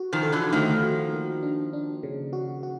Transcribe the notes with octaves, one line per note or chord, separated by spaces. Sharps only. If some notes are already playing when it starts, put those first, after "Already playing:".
Already playing: F#4
D#3 F3
A4
D3 E3
D#3 F3 A3
F#4
A#3
D4
D4
C#3
F#4
F#4